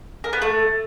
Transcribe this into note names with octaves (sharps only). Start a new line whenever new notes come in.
A#4
B3
A3